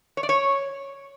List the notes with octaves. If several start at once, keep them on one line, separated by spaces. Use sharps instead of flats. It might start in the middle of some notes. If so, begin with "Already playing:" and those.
C#5
D5
C#5